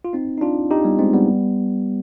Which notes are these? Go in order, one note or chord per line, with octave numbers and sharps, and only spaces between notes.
F4
C4 D#4
D#4
D4 F4
D#4 G4
G3 B3
G#3 C4
G3 B3